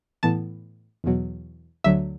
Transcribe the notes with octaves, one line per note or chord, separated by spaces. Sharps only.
A2 E3 B3 A5
E2 B2 F#3
D2 D3 F#3 E5